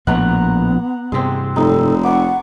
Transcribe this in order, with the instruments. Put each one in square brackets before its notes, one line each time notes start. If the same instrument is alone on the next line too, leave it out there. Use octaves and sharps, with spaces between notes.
[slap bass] A#1 A2 [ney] B3 [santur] F#5 A#5 C#6
[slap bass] G2 C3 [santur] G#3 C4
[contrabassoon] F1 [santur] D#4 [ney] A4
[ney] F#5 [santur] C#6 D6